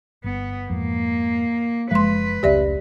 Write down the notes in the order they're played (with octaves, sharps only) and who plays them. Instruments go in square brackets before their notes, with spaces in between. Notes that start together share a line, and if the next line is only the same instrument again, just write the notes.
[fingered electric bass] G1 [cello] B3
[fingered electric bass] F2 G#2 [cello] A#3
[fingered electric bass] F#1 F3 [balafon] G#3 C6 [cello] B4
[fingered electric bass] F1 C#2 C#4 [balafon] G4 D5 E5